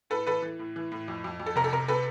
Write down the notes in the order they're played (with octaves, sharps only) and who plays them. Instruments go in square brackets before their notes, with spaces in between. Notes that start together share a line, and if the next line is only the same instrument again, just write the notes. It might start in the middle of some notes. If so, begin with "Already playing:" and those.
[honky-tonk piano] A2 A4 B4
E3 A4 B4
E3
A2
E3
A2
F2
F2
F2
A4
C3 A#4
A4
C3 A#4
C3 A4 B4